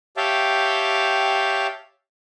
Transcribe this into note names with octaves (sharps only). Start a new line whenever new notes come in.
G4 C#5 E5 F5 G5 A5